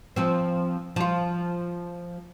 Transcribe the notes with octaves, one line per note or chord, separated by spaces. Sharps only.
F3 C4
F3 F4